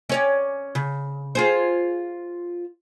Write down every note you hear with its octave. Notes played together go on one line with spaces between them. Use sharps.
C#4 C#5 D5
C#3
F4 G#4 C5